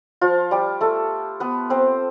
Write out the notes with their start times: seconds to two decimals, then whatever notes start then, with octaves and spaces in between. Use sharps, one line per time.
0.21 F3 F4
0.51 G3 G4
0.81 A3 A4
1.40 B3 B4
1.70 C4 C5